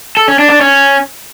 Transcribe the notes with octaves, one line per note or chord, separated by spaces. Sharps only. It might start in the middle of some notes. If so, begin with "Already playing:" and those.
A4
C#4
D4
D4
C#4